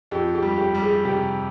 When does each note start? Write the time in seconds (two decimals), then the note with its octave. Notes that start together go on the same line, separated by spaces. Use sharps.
0.11 F2 G4
0.35 G4
0.42 G3
0.58 G4
0.75 G3
0.82 G#4
1.05 C3 G4